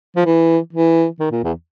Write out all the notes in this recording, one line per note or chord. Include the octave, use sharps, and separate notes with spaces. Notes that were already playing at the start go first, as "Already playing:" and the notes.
F3
E3
E3
D#3
A#2
E2